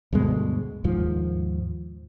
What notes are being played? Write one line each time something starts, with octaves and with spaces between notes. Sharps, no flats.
D2 G2 B2 G#3
D#2 G#2 F3